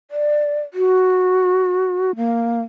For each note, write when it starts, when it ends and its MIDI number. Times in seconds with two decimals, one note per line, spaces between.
0.11 0.60 74
0.74 2.16 66
2.16 2.62 58